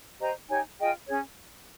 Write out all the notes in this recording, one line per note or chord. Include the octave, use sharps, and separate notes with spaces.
G4 C5 D#5 A#5
D#4 G4 C#5 G#5
F4 G#4 D#5 G5
C#4 G#4 C#5